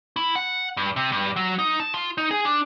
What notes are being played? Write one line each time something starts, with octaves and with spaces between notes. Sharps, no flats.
E4
F#5
G2
C3
G2
F#3
D#4
A5
F4
D#4
G#4
D4